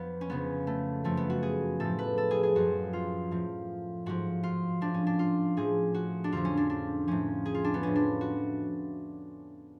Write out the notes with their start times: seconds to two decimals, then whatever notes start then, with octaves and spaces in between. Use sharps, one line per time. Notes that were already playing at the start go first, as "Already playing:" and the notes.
Already playing: F2 F3 B3
0.21 C#4
0.29 F2 C#3 F3 B3
0.67 A3
1.04 F#2 F3 A3
1.17 B3
1.30 F#4
1.43 G#4
1.80 A2 F3 A4
1.99 B4
2.18 A4
2.31 G#4
2.43 G#4
2.55 F#2 F3 F#4
2.93 F4
3.31 A2 F3
4.06 G#2 F3 F#4
4.43 F4
4.81 A2 F3 D4
4.94 C#4
5.07 D4
5.19 F4
5.57 A2 F3 G#4
5.94 F#4
6.24 D4
6.32 F2 D3 F3 F4
6.45 C#4
6.57 D4
6.70 D4
7.07 A2 F3 C#4
7.46 G#4
7.55 F4
7.64 D4
7.74 B3
7.83 A2 F3 C#4
7.96 D4
8.21 F#4